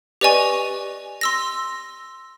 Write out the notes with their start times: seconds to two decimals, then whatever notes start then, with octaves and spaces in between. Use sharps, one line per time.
0.21 G4 B4 D5 D#5 G#5 C#6
1.21 C6 E6 A#6